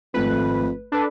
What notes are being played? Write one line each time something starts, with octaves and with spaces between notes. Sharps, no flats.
G#1 F2 A3 B4
D4 A4 B4